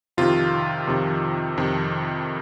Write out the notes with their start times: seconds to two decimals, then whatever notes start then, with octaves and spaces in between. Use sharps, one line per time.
0.17 F2 C3 D#3 F4
0.87 F2 C3 D#3
1.58 F2 C3 D#3